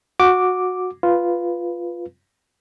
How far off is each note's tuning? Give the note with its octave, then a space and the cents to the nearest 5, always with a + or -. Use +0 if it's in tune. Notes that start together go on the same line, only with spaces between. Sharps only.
F#4 -15 D6 +0
F4 -5 B4 +0